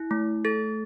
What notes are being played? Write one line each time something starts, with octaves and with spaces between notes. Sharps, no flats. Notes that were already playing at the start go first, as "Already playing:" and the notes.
Already playing: E4
A3
A4 A6